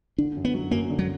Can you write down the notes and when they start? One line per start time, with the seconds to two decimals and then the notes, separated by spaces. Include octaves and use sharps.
0.18 D3 D4
0.37 F#2
0.45 B3
0.54 F#3
0.71 F#2 A#3
0.90 D3
0.99 F#3